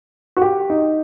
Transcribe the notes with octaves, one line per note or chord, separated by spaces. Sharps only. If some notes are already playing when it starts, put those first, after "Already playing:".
F#4
G4
D#4